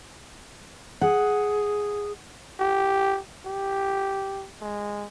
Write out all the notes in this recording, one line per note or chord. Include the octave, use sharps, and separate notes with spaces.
G#4 F#5
G4
G4
G#3